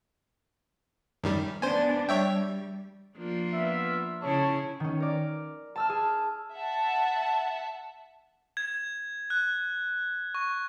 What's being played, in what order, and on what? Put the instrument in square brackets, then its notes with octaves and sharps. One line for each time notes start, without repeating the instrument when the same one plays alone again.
[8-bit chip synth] F#2 D#3 G3
[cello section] B3 D4 [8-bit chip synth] C5 G#5
[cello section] G3 [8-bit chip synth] C#5 E5 G5
[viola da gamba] F3 A#3 D4
[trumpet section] B3 F4 E5
[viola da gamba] C#3 E4 G#4 [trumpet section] C#5 A5
[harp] D#3 C#4
A#4 D5
A5 E6 F6
G#4 A5
[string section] E5 F#5 A5
[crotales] G#6
F#6
C#6